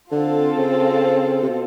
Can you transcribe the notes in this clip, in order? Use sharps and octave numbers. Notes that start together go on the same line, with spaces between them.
D3 C4 F4 A4
C#3
C3
B2